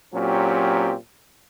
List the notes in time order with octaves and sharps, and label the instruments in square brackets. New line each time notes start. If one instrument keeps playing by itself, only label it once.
[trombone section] A#2 F#3 C4 C#4 G4